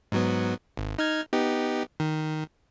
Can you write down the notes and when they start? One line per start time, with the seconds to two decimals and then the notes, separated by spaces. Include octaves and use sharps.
0.12 G#2 F#3 B3
0.77 G#1
0.99 D#4 F6 G#6
1.33 B3 D#4 G4
2.00 D#3